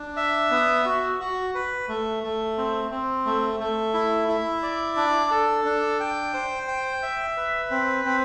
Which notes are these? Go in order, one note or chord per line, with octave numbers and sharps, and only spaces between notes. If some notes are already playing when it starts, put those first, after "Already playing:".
Already playing: D4
E5
B3
F#4
F#4
B4
A3
A3
C4
C4
A3
A3
E4
E4
D5
D4
A4
D4
G5
C5
G5
E5
B4
C4
C4